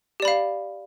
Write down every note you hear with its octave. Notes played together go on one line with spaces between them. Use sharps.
G4 D5 F5 B5